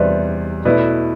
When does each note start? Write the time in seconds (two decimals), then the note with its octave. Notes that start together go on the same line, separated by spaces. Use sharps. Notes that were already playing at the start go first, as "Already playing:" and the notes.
Already playing: E2 C3 G3 B4 C5 D5 E5
0.65 B2 A3 E4 B4 D5